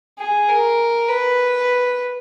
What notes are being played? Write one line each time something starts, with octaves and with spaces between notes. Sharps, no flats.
G#4
A#4
B4